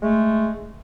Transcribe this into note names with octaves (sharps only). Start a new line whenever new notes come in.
G#3 A3